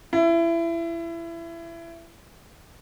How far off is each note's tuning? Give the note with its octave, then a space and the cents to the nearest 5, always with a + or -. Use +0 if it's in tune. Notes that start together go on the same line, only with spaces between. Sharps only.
E4 +25